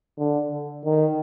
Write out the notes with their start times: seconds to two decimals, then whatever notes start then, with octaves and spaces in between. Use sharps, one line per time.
0.18 D3
0.86 D#3